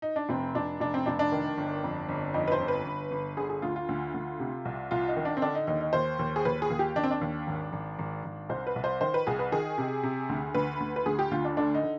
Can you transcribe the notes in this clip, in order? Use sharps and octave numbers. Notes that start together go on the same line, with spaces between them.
D#4
D4
F1 C4
F1 D4
F1 D4
C4
F1 D4
D4
D#3
G1
F2
G1
F2 D#4
B4
C5
G1
B4
G1
G1
D3 G#4
G#4
D2 F4
F4
D2
D2
C3
C2
C2 F4
D#4
D#3
D4
C4
D3 D4
D#4
D#2 D#4
D#4
D#2 C5
D#2
G#4
D#2 B4
G#4
D#2
G4
D#2 D4
C4
D4
D#2
G#1
G#1
G#1
G#1
C2 C5
B4
C2
C5
D#3 C5
B4
C2 G#4
B4
D#3 G#4
C3
C3
D2
D2 B4
D2
B4
D2 G#4
G4
D2 F4
D4
D3 D4
D#4
D3